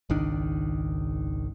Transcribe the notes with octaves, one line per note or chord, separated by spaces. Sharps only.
G#1 C#2 D#3 D4